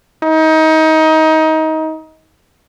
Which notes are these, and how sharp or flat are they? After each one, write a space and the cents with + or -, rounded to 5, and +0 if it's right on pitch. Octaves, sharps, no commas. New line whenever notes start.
D#4 +25